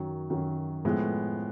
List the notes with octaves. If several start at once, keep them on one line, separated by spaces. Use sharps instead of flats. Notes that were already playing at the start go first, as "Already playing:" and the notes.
Already playing: F#2 D#3 F#3
F#2 D#3 F#3
A2 F3 G#3 B3